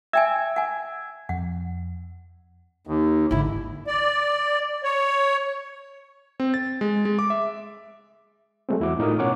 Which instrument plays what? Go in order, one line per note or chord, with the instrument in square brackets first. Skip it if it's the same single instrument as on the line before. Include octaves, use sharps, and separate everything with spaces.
[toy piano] E5 G5 G#5 [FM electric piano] E6 G#6
[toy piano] F#5 G#5
[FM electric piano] F2 [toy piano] F#5
[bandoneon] D#2
[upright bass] G#1 D3 [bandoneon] E4
[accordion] D5
C#5
[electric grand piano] C4
A6
G#3
G#3
D6
E5
[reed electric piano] F#3 G#3 A3 C4
E2 E4 F#4 D6
A2 D#4 F4 A#4 D#6
B2 C#4 C#5 F#5 D6